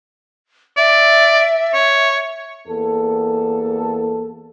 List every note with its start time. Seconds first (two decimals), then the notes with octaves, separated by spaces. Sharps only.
0.77 D5 E5
1.74 C#5
2.66 E2 A#3 A4